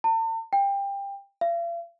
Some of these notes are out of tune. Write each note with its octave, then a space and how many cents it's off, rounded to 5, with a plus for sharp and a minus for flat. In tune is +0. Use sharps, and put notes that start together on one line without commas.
A5 +45
G5 +20
F5 -45